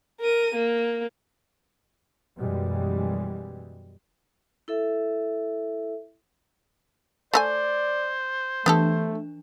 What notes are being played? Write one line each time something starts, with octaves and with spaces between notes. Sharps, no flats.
A#4 D#7
A#3
F#2 B2 E3 G3 G#3
E4 A4 E5
A3 C5 D5 D#5 G#5
E3 A3 B3 D4 G4 A4